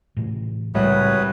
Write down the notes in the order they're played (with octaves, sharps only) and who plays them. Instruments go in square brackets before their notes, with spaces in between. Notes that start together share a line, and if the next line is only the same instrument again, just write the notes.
[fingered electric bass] A2 C3 E3
[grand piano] C2 [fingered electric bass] A2 C#3 G#3 [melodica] F#4 B4 D#6 [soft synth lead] C#5